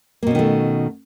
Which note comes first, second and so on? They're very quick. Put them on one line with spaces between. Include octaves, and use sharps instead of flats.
A#3 B2 C#4 D#3 A3